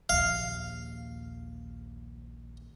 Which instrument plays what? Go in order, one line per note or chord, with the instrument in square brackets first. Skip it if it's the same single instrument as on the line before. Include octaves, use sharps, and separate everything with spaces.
[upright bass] A#1 D#2 [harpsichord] F5